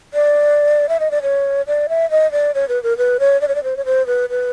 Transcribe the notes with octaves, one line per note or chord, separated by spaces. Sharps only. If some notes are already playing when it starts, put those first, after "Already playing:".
D5
E5
D#5
D5
C#5
D5
E5
D#5
D5
C#5
B4
A#4
B4
C#5
D5
C#5
D5
C5
C#5
C5
B4
B4